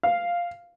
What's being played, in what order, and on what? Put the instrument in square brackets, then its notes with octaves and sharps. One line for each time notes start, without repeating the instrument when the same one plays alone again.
[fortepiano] F5